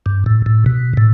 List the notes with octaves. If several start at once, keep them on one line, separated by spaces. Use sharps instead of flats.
G2
A2
A2
B2
A2